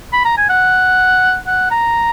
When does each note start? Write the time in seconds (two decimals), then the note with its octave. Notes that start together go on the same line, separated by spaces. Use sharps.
0.13 B5
0.25 A#5
0.38 G#5
0.49 F#5
1.47 F#5
1.71 A#5